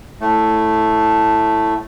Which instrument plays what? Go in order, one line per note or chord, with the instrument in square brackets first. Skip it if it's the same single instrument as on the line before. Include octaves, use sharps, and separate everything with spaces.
[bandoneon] A2 A3